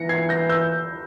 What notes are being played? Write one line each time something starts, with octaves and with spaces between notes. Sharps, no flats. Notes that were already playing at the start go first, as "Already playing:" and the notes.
Already playing: E3 A#6 C#7
G#6 C7
G6 A#6
E6 G6